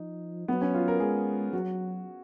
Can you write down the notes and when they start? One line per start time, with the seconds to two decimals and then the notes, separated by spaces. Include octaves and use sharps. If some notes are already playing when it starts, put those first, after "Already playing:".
Already playing: F3 D#4
0.48 F#3 B3
0.61 C#4
0.74 F4
0.88 A#4
1.00 G#3 G#4
1.53 F#3 F#4